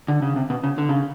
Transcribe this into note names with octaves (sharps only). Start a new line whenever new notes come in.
D3
C#3
C3
B2
C#3
D3
C#3